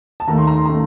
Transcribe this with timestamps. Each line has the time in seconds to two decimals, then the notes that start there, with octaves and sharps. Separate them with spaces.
0.20 A5
0.28 D#2 D#3 A3 A#5
0.38 C6
0.47 A#5
0.57 C6
0.65 D#3 A3 A#5